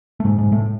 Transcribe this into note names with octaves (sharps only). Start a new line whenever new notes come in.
A3
G#2 G#3
G#2 G#3
A2 A3